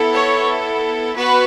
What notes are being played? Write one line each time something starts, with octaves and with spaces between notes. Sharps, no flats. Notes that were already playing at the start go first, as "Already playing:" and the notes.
Already playing: B3 E4 A4
C#5
B3 F#4 B4